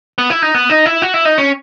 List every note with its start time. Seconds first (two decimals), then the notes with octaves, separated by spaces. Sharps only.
0.18 B3
0.30 E4
0.42 D#4
0.55 B3
0.70 D#4
0.86 E4
1.02 F#4
1.14 E4
1.25 D#4
1.38 C#4